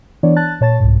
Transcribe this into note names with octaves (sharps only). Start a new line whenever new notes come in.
E3 B3 D4 C#5 D5
A5 F#6 A6
A#2 C#5 A5 A6
C2 G#2